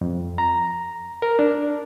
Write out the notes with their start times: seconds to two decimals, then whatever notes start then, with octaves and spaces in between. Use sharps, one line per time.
0.01 F2
0.38 A#5
1.22 A#4
1.39 D4